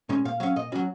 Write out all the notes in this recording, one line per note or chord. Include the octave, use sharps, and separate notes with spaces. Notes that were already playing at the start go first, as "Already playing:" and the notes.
A#2 G#3 C#4
A#2 F5
F#3 C#4 F5
A#2 D#5
F#3 C#4 F#4